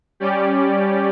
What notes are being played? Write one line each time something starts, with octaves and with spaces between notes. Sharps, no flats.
G3 C#4 G4 D5